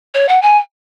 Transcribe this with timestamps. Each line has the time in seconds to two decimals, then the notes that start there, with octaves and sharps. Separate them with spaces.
0.14 C#5
0.29 F#5
0.42 G#5